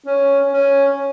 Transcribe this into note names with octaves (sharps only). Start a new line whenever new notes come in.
C#4
C#4